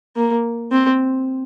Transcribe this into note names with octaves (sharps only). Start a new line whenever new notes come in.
A#3
C4